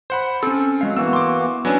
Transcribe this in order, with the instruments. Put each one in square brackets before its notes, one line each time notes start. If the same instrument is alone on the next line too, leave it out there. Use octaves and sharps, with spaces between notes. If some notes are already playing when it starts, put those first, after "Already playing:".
[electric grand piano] C5 F#5 B5
[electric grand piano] C4 [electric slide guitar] C#4 A4
[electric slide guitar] F#3 G#3 F5
[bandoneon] E3 A#3 F#4 [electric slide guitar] B3 [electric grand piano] E6
[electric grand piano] C6 D6
[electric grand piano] F#3 D4 [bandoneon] C#4 B4